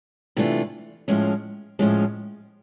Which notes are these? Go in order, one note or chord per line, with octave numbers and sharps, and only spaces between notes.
C3 E3 A3 D4 F4
A2 F3 G#3 C#4
A2 F3 G#3 C#4